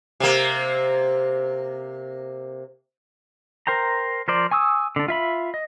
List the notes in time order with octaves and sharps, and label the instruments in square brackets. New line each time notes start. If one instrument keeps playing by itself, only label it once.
[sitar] C3 A#3
[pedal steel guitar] A#4 C5 G5 A#5
F3 A#4 C5 D5
G#5 C#6 D#6 E6
D3 D4
F4 E5 B5
D#5